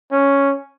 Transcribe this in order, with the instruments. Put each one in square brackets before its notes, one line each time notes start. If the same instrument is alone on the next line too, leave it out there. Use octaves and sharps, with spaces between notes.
[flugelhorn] C#4